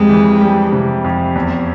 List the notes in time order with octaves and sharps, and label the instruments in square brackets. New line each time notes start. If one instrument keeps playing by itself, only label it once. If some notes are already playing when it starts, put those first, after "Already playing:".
Already playing: [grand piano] F2 G3 [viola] G#3
[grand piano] E3
G3
C3
F2
E2